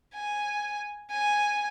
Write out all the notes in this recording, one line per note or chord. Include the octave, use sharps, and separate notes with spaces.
G#5
G#5